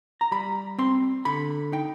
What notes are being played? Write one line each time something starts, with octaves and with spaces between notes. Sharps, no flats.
A#5
G3 B5
C4 C6
D3 B5
D#4 G5